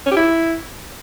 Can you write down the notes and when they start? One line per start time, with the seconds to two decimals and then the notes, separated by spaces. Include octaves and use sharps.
0.06 C#4
0.11 G4
0.17 E4